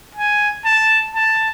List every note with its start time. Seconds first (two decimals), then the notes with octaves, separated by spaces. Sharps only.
0.15 G#5
0.65 A5
1.15 A5